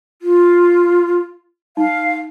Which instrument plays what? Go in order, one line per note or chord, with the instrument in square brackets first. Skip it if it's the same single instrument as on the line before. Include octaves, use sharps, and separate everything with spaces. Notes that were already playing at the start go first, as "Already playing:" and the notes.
[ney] F4
[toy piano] D#4 [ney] F5